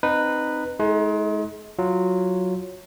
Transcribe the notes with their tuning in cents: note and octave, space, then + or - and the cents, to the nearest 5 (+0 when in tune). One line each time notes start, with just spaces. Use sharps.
C4 +0 D#4 -20 B4 +0
G#3 +35 D#4 +45 A4 +0
F#3 -5 F4 +0